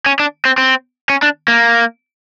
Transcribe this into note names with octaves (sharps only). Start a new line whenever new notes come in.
C#4
D4
C4
C4
C#4
D4
A#3